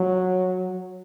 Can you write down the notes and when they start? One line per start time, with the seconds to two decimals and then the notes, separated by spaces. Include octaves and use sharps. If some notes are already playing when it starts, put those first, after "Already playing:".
Already playing: F#3